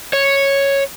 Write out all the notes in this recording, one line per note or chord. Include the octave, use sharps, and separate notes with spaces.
C#5